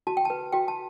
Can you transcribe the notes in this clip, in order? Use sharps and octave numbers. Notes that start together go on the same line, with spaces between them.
F#4 A5
G5
B4 A5
F#4 G5
A5